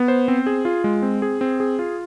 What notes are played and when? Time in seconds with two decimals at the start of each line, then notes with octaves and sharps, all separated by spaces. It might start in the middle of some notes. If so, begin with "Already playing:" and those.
Already playing: B3
0.08 C5
0.28 C4
0.46 G#4
0.65 F4
0.84 G#3
1.02 C4
1.22 G#4
1.41 C4
1.60 G#4
1.79 F4